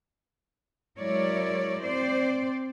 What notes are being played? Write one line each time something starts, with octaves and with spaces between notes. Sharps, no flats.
F#3 G#3 E4 A#4 C#5 D5
C4 C5 D5